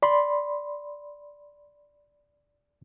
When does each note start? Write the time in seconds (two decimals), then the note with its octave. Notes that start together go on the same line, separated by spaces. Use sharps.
0.02 D5 B5 C6